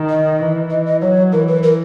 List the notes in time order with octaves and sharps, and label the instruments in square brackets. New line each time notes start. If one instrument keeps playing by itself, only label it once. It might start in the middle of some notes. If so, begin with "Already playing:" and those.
Already playing: [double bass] D#3
[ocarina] D#5
[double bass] E3
[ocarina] D#5
D#5
[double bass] F#3 [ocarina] C#5
[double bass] E3 [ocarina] A#4
[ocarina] B4
A#4